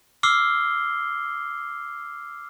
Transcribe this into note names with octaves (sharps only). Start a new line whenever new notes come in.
D6 E6 F6 C7 G7